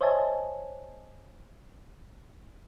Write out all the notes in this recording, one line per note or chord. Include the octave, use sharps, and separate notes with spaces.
C5 C#5 D#5 E5 G#5 A5